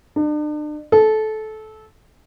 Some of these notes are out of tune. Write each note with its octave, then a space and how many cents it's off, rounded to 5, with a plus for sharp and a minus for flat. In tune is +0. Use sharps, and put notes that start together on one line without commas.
D4 +40
A4 -20